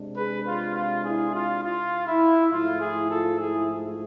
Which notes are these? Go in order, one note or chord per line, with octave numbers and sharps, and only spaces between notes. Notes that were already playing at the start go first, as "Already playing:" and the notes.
Already playing: C3 G#3 D4
G#4 B4
F4
F4
E4 G#4
F4
F4
E4
G#2 F3 A3 F4
E4 G#4
F4 A4
E4 G#4